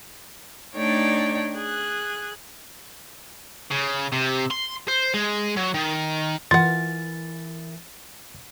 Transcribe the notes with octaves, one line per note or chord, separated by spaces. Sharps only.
A3 D4 D#4 C#5 D5 G5
G#4 F#6
C#3
C3
C6
C5
G#3
F#3
D#3
E3 F4 A#4 F#5 G#5 A6